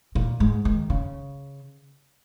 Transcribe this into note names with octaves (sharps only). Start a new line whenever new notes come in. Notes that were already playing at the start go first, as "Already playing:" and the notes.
A#2
G#2
D#3
C#3